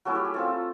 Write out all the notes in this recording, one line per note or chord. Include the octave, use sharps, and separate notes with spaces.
F#3 A3 C#4 E4
G4
G#4
A3 C4 F4 A4